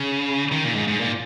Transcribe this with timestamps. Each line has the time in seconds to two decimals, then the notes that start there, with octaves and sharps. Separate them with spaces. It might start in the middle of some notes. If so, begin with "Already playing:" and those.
Already playing: C#3
0.52 D#3
0.64 A#2
0.76 G#2
0.88 G#2
1.01 A#2